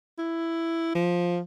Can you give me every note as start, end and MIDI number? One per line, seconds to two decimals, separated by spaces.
0.18 0.94 64
0.95 1.39 53